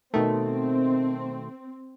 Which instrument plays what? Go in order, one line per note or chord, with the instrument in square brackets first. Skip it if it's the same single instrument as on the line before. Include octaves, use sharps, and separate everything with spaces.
[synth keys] B2 D#3 A3 [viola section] C4